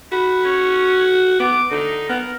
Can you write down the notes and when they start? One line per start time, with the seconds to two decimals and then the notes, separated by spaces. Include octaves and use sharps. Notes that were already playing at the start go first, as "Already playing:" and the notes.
0.12 F#4 B5
0.44 C#4
1.40 B3 D6
1.71 D3 D#4
2.09 B3 A#4